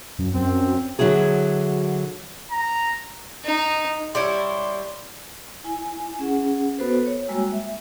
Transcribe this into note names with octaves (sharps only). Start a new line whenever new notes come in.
F#2
F#2 C4
D3 F#3 E4 F#4 G#4
A#5
D#4
G3 E4 C#5 C6
E4 G#5
C#4 G#4 F#5
B3 F#4 A4 B4 C5
C#5
G3 G#3 A#3 F#4 G#5 E6
E5